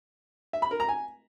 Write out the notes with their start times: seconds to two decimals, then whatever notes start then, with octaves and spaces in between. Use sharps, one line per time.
0.53 E5
0.62 B5
0.71 A#4
0.80 A#5
0.89 G#5